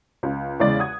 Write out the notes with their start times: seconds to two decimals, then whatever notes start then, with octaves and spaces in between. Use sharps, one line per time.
0.23 C#2
0.60 E2 C#3 G#3 D5
0.79 F#5 D#6 G#6